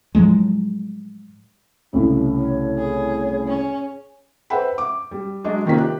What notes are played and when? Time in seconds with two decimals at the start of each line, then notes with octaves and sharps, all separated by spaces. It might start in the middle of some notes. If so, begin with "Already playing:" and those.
0.15 A2 F3 F#3 G#3
1.93 C2 A2 C#3 E4
2.36 C#5
2.78 G#4
3.47 C#4
4.50 B4 C5 E5 F#5 G5 B5
4.78 D6
5.11 G3
5.44 F#3 G#3 D4 D#5
5.66 C3 D#3 A#3 C#4 F4 B6
5.78 G4 F#6